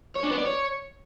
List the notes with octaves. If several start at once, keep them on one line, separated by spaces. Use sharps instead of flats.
C#5
D4
B3
D5
C#5